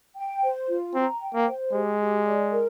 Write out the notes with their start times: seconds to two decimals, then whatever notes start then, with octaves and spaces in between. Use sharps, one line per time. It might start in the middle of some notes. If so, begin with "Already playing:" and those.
0.16 G5
0.42 C5
0.68 F4
0.94 C4 A#5
1.20 G5
1.34 A#3
1.46 C5
1.72 G#3 G4
2.00 G4
2.25 D5
2.52 A#4